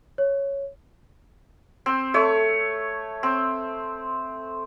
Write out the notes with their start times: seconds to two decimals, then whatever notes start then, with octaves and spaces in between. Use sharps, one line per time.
0.18 C#5
1.86 C4
2.14 A3 C#5
3.23 C4